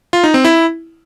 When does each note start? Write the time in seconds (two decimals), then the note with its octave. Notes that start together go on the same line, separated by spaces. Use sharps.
0.13 F4
0.24 D#4
0.34 C4
0.45 E4